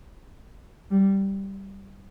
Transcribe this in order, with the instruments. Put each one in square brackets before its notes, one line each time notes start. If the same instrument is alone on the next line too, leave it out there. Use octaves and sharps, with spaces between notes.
[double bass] G3